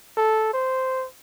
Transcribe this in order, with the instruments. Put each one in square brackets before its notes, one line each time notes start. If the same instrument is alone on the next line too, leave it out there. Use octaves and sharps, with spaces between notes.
[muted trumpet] A4
C5